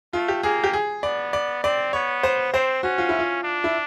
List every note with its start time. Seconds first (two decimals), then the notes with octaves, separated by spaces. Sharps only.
0.13 A3 F4
0.28 G4
0.43 A#3 G#4
0.64 G4
0.73 G#4
1.03 B3 D5
1.33 D5
1.63 C4 D5
1.93 B3 C#5
2.23 C5
2.53 C4 C5
2.83 C#4 F#4
2.98 F4
3.09 E4
3.19 F4
3.43 D4
3.64 E4